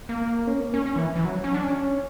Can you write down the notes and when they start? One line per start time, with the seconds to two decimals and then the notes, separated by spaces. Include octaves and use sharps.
0.09 A#3
0.47 C#4
0.60 A#3
0.74 C#4
0.86 C#4
0.96 E3
1.16 E3
1.25 F#3
1.44 C#4
1.54 D4
1.63 C#4